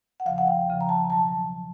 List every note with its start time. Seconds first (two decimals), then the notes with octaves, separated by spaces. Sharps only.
0.20 F#5
0.25 E2 C#3 F3 F5
0.38 F#5
0.47 G5
0.68 E2 C#3 F3
0.81 A#5
0.89 A5
1.10 B2 F#3 A5